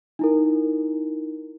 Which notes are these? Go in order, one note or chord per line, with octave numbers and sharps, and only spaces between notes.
D#4 E4 A#4